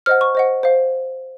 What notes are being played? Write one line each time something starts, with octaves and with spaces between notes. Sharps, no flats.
C5 D#5 F#5 F6
C#6
C5 D#5 F#5
C5 F5